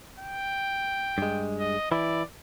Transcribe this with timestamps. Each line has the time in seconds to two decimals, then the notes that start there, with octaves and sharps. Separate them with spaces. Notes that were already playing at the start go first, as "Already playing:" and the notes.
0.20 G5
1.18 G2 G#3
1.59 D#5
1.92 E3 E4 D5